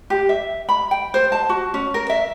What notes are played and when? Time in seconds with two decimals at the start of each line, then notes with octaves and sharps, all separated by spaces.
0.10 G4
0.29 E5
0.69 B5
0.91 G5
1.14 C5
1.32 A5
1.49 F#4
1.74 C#4
1.94 A#4
2.10 E5